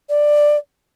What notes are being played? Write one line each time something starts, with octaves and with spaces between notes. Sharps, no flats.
D5